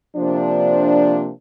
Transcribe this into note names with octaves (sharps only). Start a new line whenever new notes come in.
C3 F3 A#3 D4